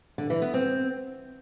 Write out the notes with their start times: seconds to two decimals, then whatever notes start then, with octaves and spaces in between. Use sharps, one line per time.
0.18 D3
0.30 E3
0.42 B3
0.54 C4